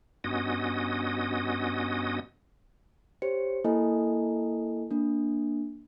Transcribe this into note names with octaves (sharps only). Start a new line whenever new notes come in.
G2 B3 C#4 F#4 D#5 D#6
G4 C5 C#5 C#7
A#3 E4 A4 D#5 G#5
A#3 D4